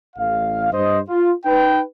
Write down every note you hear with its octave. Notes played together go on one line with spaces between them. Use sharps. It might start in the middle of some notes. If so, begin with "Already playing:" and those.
A1 F5
G2 C5 D#5
F4
D#4 B4 G5